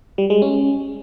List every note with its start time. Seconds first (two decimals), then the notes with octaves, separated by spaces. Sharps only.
0.18 G3
0.30 G#3
0.42 C#4